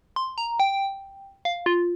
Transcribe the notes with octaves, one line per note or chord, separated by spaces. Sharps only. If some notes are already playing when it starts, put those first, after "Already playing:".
C6
A#5
G5
F5
F4